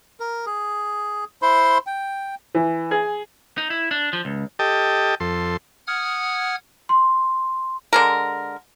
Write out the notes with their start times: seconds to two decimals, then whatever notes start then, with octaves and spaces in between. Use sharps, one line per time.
0.20 A#4
0.46 G#4
1.42 E4 C5 C6
1.87 G5
2.55 E3
2.91 G#4
3.58 D#4
3.70 E4
3.91 D4
4.13 F3
4.25 C#2
4.59 G4 A4 D#5 G5 A5
5.20 F2 A4 C6
5.87 F#5 D#6 F6 G#6
6.89 C6
7.93 D3 G#3 A#4